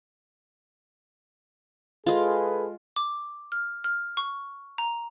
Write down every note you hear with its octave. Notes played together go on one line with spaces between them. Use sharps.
G#3 F4 G#4 A4 B4
D6
F6
F6
C#6
A#5